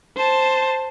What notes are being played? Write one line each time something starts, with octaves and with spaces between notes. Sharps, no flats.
C5 A5